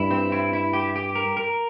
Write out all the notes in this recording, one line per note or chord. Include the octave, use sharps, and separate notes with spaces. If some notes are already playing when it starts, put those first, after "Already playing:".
Already playing: G2 E4
C4
E4
E4
G4
G4
A#4
A#4